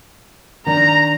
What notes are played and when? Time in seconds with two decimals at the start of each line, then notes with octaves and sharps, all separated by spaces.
0.66 D#3 D4 A#5